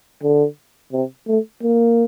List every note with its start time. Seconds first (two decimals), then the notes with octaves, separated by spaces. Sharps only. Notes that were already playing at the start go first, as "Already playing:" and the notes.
0.23 D3
0.92 C3
1.27 A3
1.63 A#3